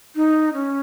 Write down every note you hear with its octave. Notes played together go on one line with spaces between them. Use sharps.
D#4
C#4